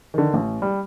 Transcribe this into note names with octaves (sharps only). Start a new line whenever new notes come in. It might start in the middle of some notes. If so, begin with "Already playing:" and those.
D3 D#3
A1
G3